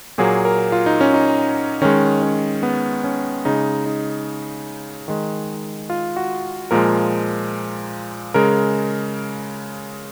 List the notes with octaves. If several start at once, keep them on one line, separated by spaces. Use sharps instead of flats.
A#2 F#3 A#3 G#4
A#4
F4
D#4
C#4
D#4
D#3 G#3 C#4
C#4
B3
C#4
C#3 G#3 D#4
D#4
D#3 G#3
F4
F#4
A#2 F3 G#3 A#4
C#3 G#3 A#4